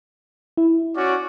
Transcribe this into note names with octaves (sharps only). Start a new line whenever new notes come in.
E4
C#4 F#4 D5